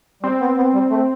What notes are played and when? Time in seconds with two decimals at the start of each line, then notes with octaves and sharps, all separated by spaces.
0.23 G3 C4
0.41 B3
0.57 B3
0.74 G3
0.90 A3